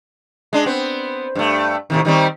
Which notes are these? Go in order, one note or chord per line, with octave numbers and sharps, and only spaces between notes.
G#3 D4
B3 C4
G2 A3
A2 C3 D#3
D#3 G3 C4